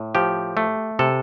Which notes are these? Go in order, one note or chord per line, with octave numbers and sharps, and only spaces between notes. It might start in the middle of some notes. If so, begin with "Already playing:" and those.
Already playing: A2
F3 G4
A3
C3 A4